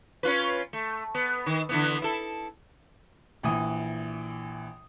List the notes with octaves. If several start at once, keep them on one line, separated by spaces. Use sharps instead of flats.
C#4 F4 B4
A3
B3
D#3
D3 E3 B3
E4 A4
A#1 E3 D#6